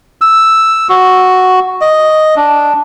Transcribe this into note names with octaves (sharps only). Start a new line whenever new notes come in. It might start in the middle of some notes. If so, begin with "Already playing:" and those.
E6
F#4
D#5
D4